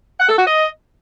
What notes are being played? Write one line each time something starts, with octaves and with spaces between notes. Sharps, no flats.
F#5
A4
F#4
D#5